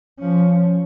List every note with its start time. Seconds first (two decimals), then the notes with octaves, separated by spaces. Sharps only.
0.19 F3 C#4